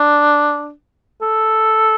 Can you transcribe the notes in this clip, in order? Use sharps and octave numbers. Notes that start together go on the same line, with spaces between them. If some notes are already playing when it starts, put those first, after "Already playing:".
Already playing: D4
A4